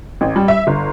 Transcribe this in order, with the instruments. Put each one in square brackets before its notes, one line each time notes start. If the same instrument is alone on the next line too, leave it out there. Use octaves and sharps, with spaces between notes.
[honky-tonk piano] A1
G3
E5
G1